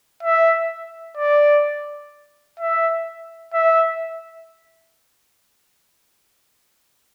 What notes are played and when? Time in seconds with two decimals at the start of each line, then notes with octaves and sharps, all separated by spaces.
0.23 E5
1.17 D5
2.59 E5
3.54 E5